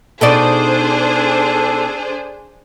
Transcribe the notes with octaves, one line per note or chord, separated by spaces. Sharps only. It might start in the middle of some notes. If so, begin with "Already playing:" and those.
B2 D4 D#4 G#4 A4 C5 D5